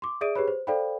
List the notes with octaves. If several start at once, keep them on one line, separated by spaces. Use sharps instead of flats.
C6 D6
G#4 D5 E5 D#6 D7 D#7
G4 G#4 B4 C#5 B5
C5
A4 C5 D5 F5 G5 B5